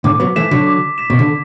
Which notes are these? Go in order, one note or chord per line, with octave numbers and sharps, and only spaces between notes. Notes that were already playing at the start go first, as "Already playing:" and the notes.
A2 D3 D6
F#3 B3
E3 A3 B6 E7
D3 F#3
D6
B6 E7
B2
D3